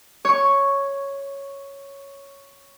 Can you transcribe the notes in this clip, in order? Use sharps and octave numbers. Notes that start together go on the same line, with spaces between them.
C#5 C#6